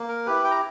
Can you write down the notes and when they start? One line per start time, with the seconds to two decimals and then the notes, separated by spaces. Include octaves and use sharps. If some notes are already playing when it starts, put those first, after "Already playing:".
Already playing: A#3
0.08 A#4
0.26 E4 G4 B4
0.44 G5
0.51 A#5